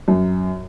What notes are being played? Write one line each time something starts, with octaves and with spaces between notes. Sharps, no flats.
F#2